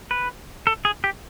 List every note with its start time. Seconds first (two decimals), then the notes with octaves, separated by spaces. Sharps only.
0.11 B4
0.67 A4
0.85 G#4
1.04 G4